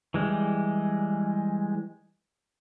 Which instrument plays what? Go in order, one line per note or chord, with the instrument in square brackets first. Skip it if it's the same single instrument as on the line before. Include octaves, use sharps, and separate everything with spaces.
[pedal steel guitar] E3 G3 G#3